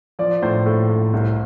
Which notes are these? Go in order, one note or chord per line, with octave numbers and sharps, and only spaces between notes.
F3 D5
A2 C5
A2
A2
C2